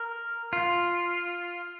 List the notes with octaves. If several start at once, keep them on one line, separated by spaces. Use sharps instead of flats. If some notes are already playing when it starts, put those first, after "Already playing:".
Already playing: A#4
F4